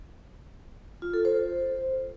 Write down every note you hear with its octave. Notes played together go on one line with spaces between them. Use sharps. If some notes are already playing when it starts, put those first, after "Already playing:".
F4
A4
C5